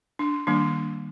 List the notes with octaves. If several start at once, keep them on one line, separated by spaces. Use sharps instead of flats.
D4
D#3 G3 A#3 D4